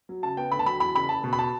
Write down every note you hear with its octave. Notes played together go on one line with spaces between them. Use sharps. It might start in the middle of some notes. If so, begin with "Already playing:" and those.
F#3
C#3 A5
B3 G5
D2 B5
A5
F#3 B5
E2 B5
F#1 B5
F#1 A5
B2
B5
A5